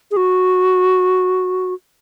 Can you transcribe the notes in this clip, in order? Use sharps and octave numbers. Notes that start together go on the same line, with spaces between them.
G#4
F#4